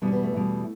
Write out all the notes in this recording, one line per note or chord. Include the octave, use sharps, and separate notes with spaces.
E2 B2 G3 B3
C#4
B3
A3
E2 B2 G3